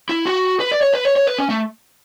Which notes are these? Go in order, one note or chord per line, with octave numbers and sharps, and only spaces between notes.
E4
F#4
B4
D5
C#5
B4
C#5
C#5
B4
C#4
A3